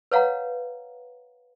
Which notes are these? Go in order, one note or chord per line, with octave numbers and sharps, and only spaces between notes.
B4 C#5 F5 F#5 A#5